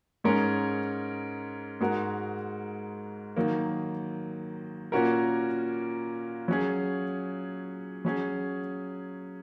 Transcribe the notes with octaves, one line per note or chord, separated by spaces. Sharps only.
G#2 G#3 C#4 A#4
G#2 G#3 F#4 A#4
D#3 F#3 A#3
A#2 A#3 C#4 F#4 A#4
F#3 C#4 G#4
F#3 C#4 G#4